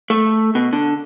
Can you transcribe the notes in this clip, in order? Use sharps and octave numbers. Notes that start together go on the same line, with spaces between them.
A3
B2
D3